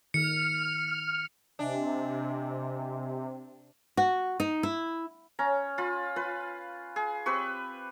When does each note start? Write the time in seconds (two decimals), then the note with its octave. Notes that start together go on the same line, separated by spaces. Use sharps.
0.14 D#3 F6 C#7
1.59 C3 D4 D#5 E5 G#5
3.97 F#4
4.40 D#4
4.63 E4
5.39 C#4 A#5
5.78 F4 B5
6.16 F4 B4
6.96 G#4
7.26 C4 G4 B4 C#6